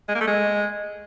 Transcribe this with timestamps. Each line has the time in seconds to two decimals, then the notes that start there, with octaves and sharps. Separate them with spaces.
0.08 G#3
0.15 A#3
0.21 A3
0.27 G#3